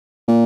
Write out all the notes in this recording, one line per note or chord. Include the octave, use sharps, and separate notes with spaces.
A#2